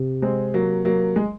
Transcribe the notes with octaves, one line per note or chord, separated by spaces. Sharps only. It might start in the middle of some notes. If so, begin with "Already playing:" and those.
Already playing: C3
G#3 C4
F#3 A#3
F#3 A#3
G#3